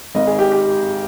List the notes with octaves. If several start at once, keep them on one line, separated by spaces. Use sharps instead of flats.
G#1 G#2 D#3 D#5
G#4
G4
G4